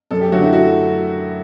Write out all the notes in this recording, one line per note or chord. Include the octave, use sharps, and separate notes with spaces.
F#2 A4
G4
D3 F#3 A3 F#4
E4
F#4